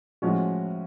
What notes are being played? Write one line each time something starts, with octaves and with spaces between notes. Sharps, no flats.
A2 F3 G#3 C#4 F#4